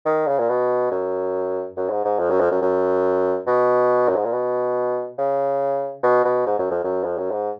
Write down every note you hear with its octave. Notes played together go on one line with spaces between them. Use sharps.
D#3
C#3
A#2
B2
F#2
F#2
G#2
G#2
F2
F#2
F2
F#2
F#2
B2
F#2
G#2
A#2
B2
C#3
B2
B2
G#2
F#2
F2
F#2
F2
F#2
G#2